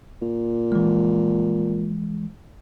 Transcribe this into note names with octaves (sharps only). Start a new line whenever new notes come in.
A#2
E3 G#3